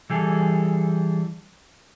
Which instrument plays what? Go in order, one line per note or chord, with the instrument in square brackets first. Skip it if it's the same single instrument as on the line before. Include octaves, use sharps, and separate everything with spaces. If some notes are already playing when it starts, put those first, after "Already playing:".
[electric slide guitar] E3 G3 G#4 A4